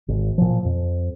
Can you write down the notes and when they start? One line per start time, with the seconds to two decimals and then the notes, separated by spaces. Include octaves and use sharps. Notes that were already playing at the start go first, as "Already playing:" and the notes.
0.08 G#1
0.38 A#2 F3
0.65 F2